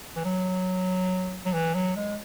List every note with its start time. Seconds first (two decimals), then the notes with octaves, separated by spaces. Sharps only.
0.16 E3
0.25 F#3
1.46 F#3
1.53 E3
1.75 F#3
1.96 G#3